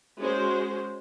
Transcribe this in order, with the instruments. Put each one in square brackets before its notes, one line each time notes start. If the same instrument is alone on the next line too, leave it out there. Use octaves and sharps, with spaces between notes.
[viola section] G#3 C#4 F#4 C5